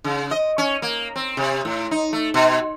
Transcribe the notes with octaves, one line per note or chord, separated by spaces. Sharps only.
C#3
D#5
C#4
A#3
C4
C3
A2
D#4
A3
B2